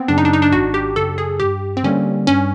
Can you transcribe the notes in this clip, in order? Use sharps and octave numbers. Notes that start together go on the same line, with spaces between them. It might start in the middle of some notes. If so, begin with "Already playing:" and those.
Already playing: B3 C4
F#2 C#3 D4
D#4
D4
D#4
D4
G#1 F#4
G4
F#2 C#3 A4
G#4
G2 G4
C4
D3 G3 A#3 C#4
G2 C#4